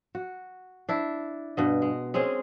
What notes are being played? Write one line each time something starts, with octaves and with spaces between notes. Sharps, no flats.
F#4
D4 E4
G2 B2 D#5
G#3
G#3 C4 C#4 G#4